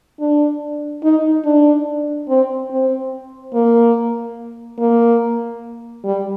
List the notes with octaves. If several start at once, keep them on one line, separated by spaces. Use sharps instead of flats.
D4
D#4
D4
C4
C4
A#3
A#3
G3